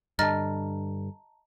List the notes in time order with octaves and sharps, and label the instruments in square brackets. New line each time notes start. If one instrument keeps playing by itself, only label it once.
[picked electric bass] G2 D3 [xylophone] D#5 F6 A6 [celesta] A5 A#5